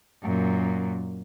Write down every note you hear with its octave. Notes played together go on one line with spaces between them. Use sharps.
F#2 A#2